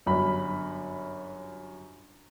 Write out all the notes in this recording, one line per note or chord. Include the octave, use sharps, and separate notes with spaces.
G1 F#2 F#4 B5